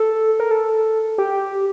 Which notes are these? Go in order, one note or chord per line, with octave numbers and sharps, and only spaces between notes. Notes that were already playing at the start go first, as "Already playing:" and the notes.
Already playing: A4
A#4
A4
G4